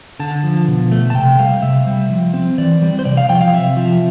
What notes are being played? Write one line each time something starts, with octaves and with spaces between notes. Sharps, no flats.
D3 A5
F3
B2
A3
A5
C3 G5
G3 F5
C3 E5
G3
F3
C4
E3 D5
G3
C5
C3 D5
F5
F3 G5
F5
C3 E5
F3